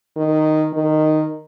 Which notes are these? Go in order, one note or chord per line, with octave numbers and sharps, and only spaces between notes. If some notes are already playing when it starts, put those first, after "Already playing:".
D#3
D#3